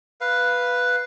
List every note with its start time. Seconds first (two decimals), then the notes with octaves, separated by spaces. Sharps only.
0.21 B4 F5